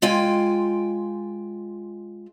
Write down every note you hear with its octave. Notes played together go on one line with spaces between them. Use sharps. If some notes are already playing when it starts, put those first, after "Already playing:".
G#3 F4 G5 G#5